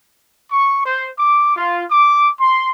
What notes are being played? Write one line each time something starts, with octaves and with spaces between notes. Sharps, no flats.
C#6
C5
D6
F4
D6
C6